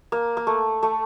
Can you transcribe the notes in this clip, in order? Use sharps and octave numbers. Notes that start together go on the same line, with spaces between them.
A#3
A#3
A3
A3